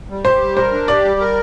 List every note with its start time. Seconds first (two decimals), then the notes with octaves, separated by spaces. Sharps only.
0.10 G3
0.25 G4 C5
0.41 G3
0.56 A#4 C5
0.72 D4
0.88 G4 D5
1.04 G3
1.20 A#4